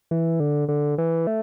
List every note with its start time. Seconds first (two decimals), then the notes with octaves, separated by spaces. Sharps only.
0.11 E3
0.40 D3
0.69 D3
0.98 E3
1.27 A3